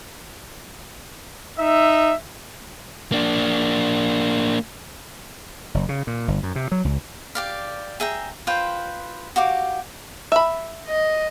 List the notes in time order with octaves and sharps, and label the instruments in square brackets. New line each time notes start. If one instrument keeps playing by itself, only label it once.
[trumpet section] D#4 E5
[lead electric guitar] A#3 D4
[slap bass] F#1
C#3
A#2
G1
F#2
C3
F#3
C#2
[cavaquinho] G4 D5 F5
G#4 E5 G5 A#5
F4 B4 C5 G5
F#4 G4 F5 D6
[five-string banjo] E5 B5
[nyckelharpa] D#5